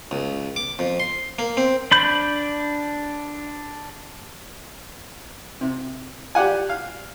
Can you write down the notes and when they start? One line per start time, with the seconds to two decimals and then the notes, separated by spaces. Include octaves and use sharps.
0.11 C#2
0.56 D6
0.79 F2
1.00 C6
1.39 A#3
1.57 C4
1.91 D4 B5 G6
5.61 C3
6.35 G4 D5 F#5 G#5
6.69 F5